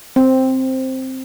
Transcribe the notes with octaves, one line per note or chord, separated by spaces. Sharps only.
C4